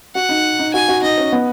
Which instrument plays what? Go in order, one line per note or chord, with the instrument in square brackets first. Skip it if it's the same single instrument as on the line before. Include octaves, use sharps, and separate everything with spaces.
[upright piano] F#4 [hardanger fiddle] F#5
[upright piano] D#4
D#4
[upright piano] F#4 [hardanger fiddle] G#5
[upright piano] F#4
[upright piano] D#4 [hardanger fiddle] D#5
[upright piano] C#4
B3